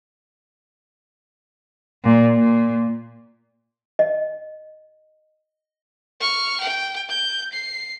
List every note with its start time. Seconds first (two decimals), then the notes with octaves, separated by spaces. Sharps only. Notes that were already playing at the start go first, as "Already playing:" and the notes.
2.04 A#2
2.37 A#2
3.99 D#5
6.21 C#6 F6
6.61 G5
7.09 G6
7.53 C7